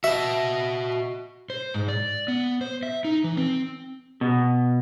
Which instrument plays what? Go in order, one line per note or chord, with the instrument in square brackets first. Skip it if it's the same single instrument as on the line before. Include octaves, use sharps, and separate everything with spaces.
[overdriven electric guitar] F#4 D#5 [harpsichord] E5
[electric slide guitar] C5
G#2
D5
B3
C5
E5
D#4
E3
C4
[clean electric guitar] B2